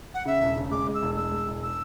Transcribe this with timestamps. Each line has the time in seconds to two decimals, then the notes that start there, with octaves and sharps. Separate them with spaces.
0.14 F#5
0.25 C#3 E5
0.41 E1
0.57 C#3
0.71 G#3 D6
0.87 G#3
0.94 E6
1.02 E1
1.17 G#3 E6
1.32 G#3
1.48 E1
1.63 E6